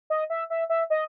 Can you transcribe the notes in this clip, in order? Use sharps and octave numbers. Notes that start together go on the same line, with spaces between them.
D#5
E5
E5
E5
D#5